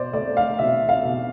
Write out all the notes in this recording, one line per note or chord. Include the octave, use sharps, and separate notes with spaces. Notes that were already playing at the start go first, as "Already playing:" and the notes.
Already playing: B2 C5 D5
A3 D5
F5
B2 E5
F5
B2